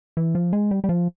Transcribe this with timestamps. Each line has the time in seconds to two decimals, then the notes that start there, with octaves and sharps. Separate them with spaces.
0.17 E3
0.35 F3
0.53 G#3
0.71 G3
0.84 G3
0.89 F3